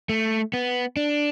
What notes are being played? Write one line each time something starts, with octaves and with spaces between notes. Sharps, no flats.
A3
B3
D4